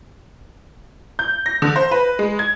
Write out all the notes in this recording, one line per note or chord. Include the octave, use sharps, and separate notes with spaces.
G6
A#6
D3
C5
B4
G#3
G#6